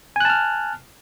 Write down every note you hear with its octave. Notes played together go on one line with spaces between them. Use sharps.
G#5 A5 F6 F#6